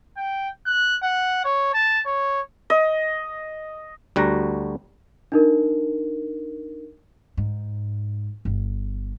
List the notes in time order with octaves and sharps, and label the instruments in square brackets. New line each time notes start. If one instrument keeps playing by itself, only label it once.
[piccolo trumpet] G5
F#6
F#5
C#5
A5
C#5
[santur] D#5
[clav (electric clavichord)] D2 G3 F#4 F#5 A#5
[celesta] D4 D#4 A#4
[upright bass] G#2
G1